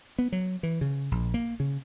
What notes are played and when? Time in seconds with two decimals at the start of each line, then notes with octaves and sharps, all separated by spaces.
0.19 B3
0.32 F#3
0.63 E3
0.81 C#3
1.11 A#1
1.34 A#3
1.60 C#3